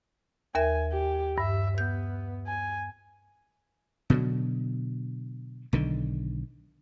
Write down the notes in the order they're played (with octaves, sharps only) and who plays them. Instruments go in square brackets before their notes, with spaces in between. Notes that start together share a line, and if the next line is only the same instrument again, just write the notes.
[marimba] D#2 A#4 E5 [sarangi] G#5
[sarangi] G4
[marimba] G2 [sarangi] E5
[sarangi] B3 [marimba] G6
[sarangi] G#5
[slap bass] B2 D3 F#3
B1 D3 D#3